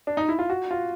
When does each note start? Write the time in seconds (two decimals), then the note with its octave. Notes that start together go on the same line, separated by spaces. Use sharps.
0.07 D4
0.17 D#4
0.29 E4
0.39 F4
0.50 F#4
0.71 F4